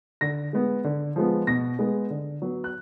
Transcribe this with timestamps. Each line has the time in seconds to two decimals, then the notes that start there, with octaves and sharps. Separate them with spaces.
0.21 D3 A#6
0.53 G#3 B3
0.84 D3
1.16 F3 G#3 B3
1.47 B2 A#6
1.79 G#3 B3
2.10 D3
2.42 F#3 B3
2.64 F#6